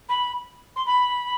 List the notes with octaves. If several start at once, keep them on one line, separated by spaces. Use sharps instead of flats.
B5
C6
B5